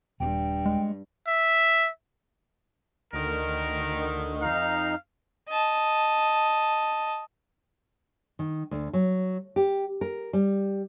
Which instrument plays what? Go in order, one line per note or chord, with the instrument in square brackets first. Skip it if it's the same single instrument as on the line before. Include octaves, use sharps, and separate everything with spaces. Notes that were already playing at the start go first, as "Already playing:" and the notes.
[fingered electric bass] D#1 [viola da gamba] G2 [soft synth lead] G5
[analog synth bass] G#3
[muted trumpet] E5
[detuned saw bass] D2 [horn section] D3 D#3 [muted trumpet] A#4
[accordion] F2 D#4 [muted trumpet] F5
[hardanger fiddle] D#5 A5
[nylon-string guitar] D#3
D2
F#3
G4
A#4
G3